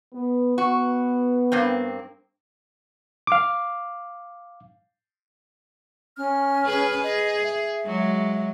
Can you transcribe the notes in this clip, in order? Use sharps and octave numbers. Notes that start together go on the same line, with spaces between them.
B3
B3 F#4
G2 A#3 C4
F5 D6
C#4 F6
G#4 B4
G#4 D#5
E5
F#3 G#3